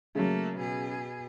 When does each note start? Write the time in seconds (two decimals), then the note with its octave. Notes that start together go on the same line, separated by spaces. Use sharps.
0.15 C#3 F#3 A3 A#3
0.57 B2 G#4